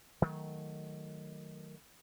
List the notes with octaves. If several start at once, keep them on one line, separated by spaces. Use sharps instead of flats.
D#3 F#3 A3